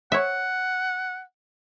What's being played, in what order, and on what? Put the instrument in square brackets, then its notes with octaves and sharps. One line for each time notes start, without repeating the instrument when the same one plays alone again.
[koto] C#5 E5 [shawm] F#5